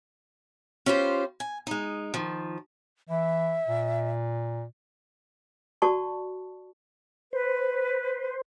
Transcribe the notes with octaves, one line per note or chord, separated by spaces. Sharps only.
C#4 F4 G4 B4 C5
G#5
G#3 D#4
D#3 F3
E3 E5
A#2
F#4 D5 A5 C#6
B4 C5